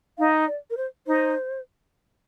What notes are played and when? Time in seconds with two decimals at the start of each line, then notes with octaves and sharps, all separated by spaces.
0.18 D#4 F5
0.47 D5
0.70 A#4
0.77 C5
1.07 D#4 C5